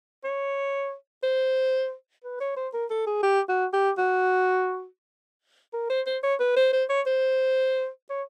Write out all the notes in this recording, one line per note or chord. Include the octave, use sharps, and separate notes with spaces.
C#5
C5
B4
C#5
C5
A#4
A4
G#4
G4
F#4
G4
F#4
A#4
C5
C5
C#5
B4
C5
C5
C#5
C5
C#5